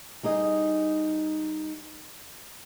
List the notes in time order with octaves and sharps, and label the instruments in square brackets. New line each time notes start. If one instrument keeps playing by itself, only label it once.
[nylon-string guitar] G3 D#4 G#4 D#5